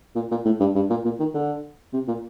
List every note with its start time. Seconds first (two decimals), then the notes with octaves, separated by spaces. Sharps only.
0.15 A#2
0.31 A#2
0.45 A2
0.60 G2
0.75 G2
0.90 A#2
1.05 A#2
1.19 D#3
1.34 D3
1.93 C3
2.07 A#2